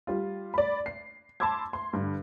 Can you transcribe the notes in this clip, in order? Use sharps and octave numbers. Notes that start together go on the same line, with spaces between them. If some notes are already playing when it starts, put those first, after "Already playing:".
G3 F4
D5 B5
C7
A5 B5 C6 D6 E6 G#6
C6
G2 D3